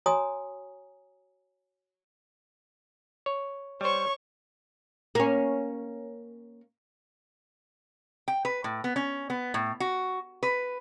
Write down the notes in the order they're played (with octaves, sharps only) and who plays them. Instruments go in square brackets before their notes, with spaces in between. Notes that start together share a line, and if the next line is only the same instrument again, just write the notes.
[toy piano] F#4 C#5 G#5 A#5 D#6
[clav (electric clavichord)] C#5
[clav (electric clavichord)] G3 C5 [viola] C#5 C#6
[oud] A#3 C#4
[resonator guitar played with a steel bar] G5
B4
A2
B3
C#4
B3
A2
F#4
B4